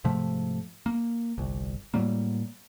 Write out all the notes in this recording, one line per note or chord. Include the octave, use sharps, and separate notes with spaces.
G#2 C3 F3 A3
A#3
G1 C2
A2 F#3 G3 A#3